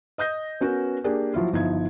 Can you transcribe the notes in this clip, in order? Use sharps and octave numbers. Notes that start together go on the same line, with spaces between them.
D#5 D#6 G6 A#6
B3 C#4 F#4 A#4 B4
A#3 D4 G4 G#4
F3 F#3 E4 F4
G1 F3 D#4 E4 G#6